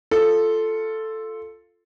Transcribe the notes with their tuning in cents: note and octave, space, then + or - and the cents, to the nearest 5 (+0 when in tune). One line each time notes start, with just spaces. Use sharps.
F4 +0 A4 +0